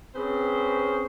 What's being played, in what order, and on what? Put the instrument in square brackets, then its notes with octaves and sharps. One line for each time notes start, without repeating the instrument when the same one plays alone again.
[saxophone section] C4 C#4 G#4 B4 C5